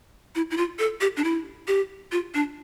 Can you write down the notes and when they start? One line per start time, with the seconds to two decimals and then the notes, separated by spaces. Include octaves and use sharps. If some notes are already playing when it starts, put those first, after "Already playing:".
0.35 E4
0.51 E4
0.57 F4
0.79 A4
1.01 G4
1.17 D4
1.24 E4
1.67 G4
2.12 F4
2.34 D4